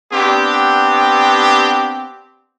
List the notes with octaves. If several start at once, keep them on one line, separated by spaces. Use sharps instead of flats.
B3 C4 D4 G4